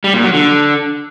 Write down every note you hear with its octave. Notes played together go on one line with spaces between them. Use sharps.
G3
A#2
F#3
D3